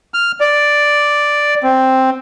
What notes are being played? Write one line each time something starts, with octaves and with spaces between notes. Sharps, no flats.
F6
D5
C4